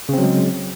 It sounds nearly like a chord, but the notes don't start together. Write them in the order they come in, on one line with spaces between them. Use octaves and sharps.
C#3 C4 F#3 G#3